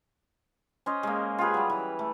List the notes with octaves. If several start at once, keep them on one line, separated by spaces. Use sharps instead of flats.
C#4 C5 D#5
G#3 A#3
F4 G4 G#4 B4
F#3 G3
E3
A3